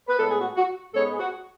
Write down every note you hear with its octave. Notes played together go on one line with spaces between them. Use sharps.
B4
A2 G#3 B3 A4
G#4
F#4
F#4
G#2 G#3 B3 A4 C#5
G#4
F#4